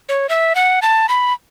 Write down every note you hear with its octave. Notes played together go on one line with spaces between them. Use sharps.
C#5
E5
F#5
A5
B5